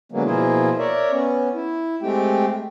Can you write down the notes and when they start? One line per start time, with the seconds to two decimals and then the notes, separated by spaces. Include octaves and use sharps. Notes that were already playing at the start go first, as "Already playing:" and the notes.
0.12 D3 F#3 G#3 A#3 B3
0.25 B2 F3 A#3 E4 F4 G#4
0.79 A#4 C#5 D5 E5
1.11 B3 C#4
1.54 E4
2.02 G#3 A3 C4 G4 G5